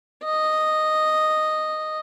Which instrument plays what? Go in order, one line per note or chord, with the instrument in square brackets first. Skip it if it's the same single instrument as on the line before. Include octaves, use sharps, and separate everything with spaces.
[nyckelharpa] D#5